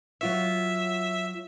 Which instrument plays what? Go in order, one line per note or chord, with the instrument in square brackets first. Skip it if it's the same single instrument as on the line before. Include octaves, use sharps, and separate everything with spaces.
[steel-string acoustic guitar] F#3 F4 C#5 [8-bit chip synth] E5